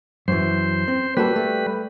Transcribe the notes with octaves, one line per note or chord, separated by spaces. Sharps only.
F#2 E3 C5
C4
G3 A#3 F#4 A4 B4
A3